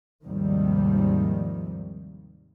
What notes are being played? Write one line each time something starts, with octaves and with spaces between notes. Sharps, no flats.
D#2 G#2 C3 D#3 F3 G3